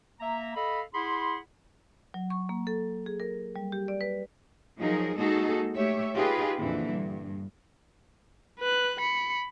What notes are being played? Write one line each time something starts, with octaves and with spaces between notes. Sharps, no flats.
A#3 E5 A#5
A4 D#5 F5 B5
E4 G#4 F#5 B5 C6
F#3
C#6
A#3
A4
G#4
A#4
G3
G4
D5
B4
F3 F#3 D#4 G#4 A#4
G#3 A#3 D#4 F#4 G#4 A4
A3 G4 C#5 E5
D#4 F4 G4 G#4 B4
F2 A#2 D3 E3
G2
B4 F#6
B5 C#7